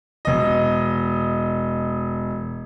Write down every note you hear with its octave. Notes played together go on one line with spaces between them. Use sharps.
E1 D#5